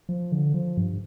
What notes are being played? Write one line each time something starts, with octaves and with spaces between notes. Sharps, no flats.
F3
D3
F3
G2